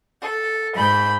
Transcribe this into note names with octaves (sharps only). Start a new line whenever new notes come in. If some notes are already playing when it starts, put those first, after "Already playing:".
A4
G#2 B5 G6